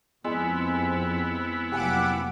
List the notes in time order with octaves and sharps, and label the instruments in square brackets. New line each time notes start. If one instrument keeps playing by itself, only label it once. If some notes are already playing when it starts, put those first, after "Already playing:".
[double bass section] F2 C4 [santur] G#3 [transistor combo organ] B3 E4
[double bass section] F1 F#3 A#3 [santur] G4 F5 G#5 [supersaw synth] F#5 D6